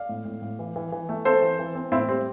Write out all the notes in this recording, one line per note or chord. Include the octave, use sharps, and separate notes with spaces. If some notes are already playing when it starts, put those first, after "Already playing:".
Already playing: D5 F5
A2
A2
A2
E3
E3
E3
A3
C4 A4 C5
E3
E3
C4
A2 C4 E4
G3 C4